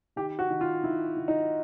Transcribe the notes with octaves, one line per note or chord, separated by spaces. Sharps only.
D#3 G4
F#4
D#3
F4
D#3 E4
D#3
D#4